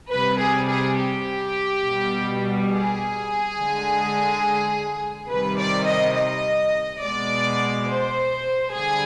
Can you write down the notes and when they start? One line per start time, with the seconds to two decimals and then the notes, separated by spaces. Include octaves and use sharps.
0.12 C3 G3 B4
0.41 G#4
0.70 G#4
0.99 G4
1.85 B2 G3
2.71 G#4
3.58 D3 G#3
5.30 C3 D#3 G3 B4
5.58 D5
5.87 D#5
6.16 D#5
7.02 B2 G#3 D5
7.88 C5
8.74 D3 G3 G#4